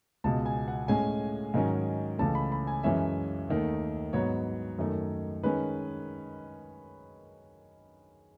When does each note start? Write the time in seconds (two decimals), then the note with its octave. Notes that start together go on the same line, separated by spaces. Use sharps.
0.24 C#2 B2 G#3 A5
0.46 G#5
0.68 F#5
0.88 A2 G#3 C#4 G#5
1.54 G#2 D#3 F#3 C#4
2.19 C#2 C#3 E3 A3 C#4 A5
2.35 B5
2.52 B5
2.67 G#5
2.83 F#2 E3 G#3 C#4 E5
3.49 D#2 D#3 A3
4.13 G#2 F#3 B3 C#5
4.78 F#2 D#3 A3
5.43 D#3 G#3 C#4 B4